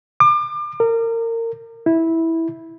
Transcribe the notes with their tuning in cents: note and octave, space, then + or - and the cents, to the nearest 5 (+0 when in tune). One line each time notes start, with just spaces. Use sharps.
D6 +35
A#4 -25
E4 -10